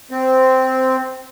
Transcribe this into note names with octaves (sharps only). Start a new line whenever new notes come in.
C4